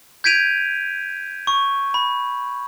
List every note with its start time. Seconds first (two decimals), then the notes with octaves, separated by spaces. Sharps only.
0.24 G6 G#6 B6 D7 D#7 F7
1.47 C#6
1.94 B5